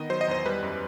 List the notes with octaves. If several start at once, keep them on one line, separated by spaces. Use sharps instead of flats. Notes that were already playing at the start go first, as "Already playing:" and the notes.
Already playing: D#3 B3 D#5
F#3 C5
D#5
E2 C5
G3 B4
F#2